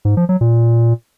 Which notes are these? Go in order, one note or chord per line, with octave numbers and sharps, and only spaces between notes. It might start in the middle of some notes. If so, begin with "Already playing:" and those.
G#2
F3
F#3
A#2